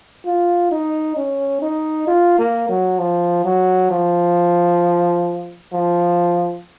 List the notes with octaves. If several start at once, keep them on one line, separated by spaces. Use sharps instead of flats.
F4
D#4
C#4
D#4
F4
A#3
F#3
F3
F#3
F3
F3